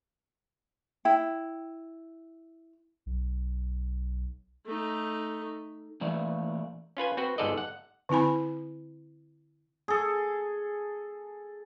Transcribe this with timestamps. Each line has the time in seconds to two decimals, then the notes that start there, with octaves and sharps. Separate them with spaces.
1.05 E4 G5
3.06 B1
4.66 A3 D#4
6.01 A#2 E3 A3 D5
6.97 C#4 F4 B4 G#5
7.17 C4 F#4 B4
7.38 G1 G#2 A4 D5 D#5
7.57 F#5
8.09 D3 C4 E4 G#5 B5
9.88 G#4 A4